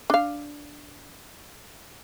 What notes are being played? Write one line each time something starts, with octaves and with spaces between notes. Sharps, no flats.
D4 F5